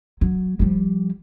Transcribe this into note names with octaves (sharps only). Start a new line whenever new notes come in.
F#3
F3 G3